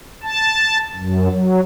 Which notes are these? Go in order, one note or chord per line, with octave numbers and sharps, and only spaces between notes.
A5
F#2
F#3